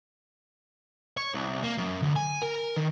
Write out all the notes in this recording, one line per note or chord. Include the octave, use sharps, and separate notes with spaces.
C#5
C2
A#3
F#2
D2
G#5
A#4
D#3